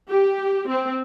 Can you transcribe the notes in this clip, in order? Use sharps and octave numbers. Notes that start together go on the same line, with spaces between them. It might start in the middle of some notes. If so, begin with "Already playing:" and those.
G4
C4